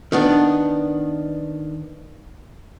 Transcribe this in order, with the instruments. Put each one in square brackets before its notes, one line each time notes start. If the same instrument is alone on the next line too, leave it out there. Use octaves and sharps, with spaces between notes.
[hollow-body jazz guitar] D#3 B3 D4